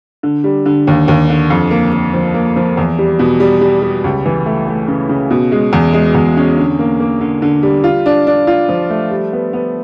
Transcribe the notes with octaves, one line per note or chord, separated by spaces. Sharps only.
D3
G3
D3
D#2
D#2
D3
F2
A#3
A#3
F3
A#3
F3
E2
G3
B2
G3
G3
G3
C#2
E3
A3
A3
C#3
C#3
B2
G#3
E2
G#3
E2
C#4
D3
A#3
A#3
D3
D3
G3
F4
D4
D4
F4
F3
A3
G3
B3
B3